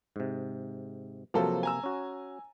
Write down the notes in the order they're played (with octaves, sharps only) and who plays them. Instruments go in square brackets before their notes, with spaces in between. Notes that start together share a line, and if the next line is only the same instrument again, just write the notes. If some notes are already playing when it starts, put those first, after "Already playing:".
[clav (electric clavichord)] G#2 C3
[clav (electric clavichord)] C3 A#3 [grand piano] F3 F#3 A4
[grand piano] G#5 A#5 E6
[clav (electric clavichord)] C#4 F#4